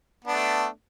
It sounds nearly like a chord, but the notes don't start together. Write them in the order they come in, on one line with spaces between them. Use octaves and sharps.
B3 D4 A3